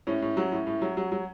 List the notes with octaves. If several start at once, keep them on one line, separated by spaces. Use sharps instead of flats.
A2 C#4
A2
F#3
A2
A2
F#3
F#3
F#3